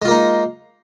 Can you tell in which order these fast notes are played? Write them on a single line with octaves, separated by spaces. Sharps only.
G#3 F4 A#3 D#4